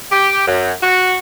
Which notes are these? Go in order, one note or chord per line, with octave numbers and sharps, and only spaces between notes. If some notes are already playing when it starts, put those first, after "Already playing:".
G4
F#2
F#4